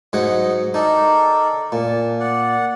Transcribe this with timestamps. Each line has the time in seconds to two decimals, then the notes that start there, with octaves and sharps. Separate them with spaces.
0.13 G#2 F#3 D#5 F#5
0.74 D#4 A4 A#4 D5
1.72 A#2 A5
2.20 D5 F#5